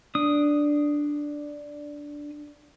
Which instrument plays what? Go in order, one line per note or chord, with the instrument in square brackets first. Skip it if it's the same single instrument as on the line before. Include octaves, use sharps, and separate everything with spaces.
[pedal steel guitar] D4 D#6